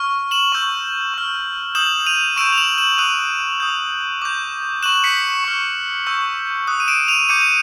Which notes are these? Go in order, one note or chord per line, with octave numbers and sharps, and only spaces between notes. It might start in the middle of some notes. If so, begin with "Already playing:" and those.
Already playing: C#6 F6
E7 F#7
C#6 E6 G6
C#6 F6
D#6 G6 E7 F#7
D#7 F7
C#6 E6 G6 D7 E7
F7
E7 F#7
E7 F#7
D#6 F#6 D#7 F7
D#6 G6
D6 G6
C#6 F#6 E7 F#7
B6 C#7
C#6 F6
C#6 E6 G6
D#6 F#6
D#7
D7 E7
D#7 F7
D6 G6 C#7 D#7
D#7